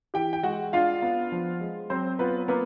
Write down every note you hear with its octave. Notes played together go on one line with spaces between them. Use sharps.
E3 G4 G5
G5
G#3 F#4 F#5
D4 F4 F5
B3
F3
G#3
F#3 C4 C5
B3 F4 B4
A#3 B3 B4